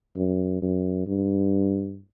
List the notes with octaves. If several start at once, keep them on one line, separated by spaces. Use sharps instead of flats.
F#2
F#2
G2